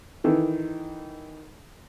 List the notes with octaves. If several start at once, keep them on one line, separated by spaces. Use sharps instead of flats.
D#3 E3 A4